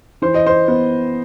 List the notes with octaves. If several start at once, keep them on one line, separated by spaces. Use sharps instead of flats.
E3 C5
D#5
C5
B3